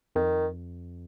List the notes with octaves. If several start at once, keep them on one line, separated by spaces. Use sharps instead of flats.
F2 D#3